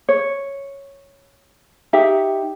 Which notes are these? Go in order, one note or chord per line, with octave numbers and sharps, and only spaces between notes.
C#5
D#4 G4 E5